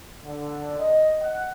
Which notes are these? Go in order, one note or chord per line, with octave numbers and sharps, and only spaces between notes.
D3
D#5
F#5